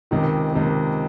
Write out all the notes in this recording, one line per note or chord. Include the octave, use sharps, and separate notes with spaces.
C#2 C3 D#3
C#2 C3 D#3